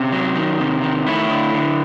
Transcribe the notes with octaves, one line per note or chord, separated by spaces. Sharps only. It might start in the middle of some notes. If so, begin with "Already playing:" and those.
Already playing: C3 C#4
F#3
D#3
C3
D#3
A3 E4
D3
D3